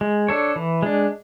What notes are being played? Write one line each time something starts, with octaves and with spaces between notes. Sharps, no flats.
G#3
D4 A4 C#5
E3
G#3 D4